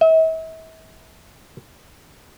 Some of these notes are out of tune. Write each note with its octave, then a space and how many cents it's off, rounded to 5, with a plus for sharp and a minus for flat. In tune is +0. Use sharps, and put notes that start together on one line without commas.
E5 -40